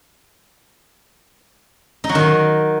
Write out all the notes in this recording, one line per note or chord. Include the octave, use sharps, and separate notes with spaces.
D#4
F#3
D#3